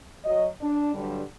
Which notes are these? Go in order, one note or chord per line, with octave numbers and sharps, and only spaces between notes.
F#3 D#5
D4
G2 D3 F#3 G3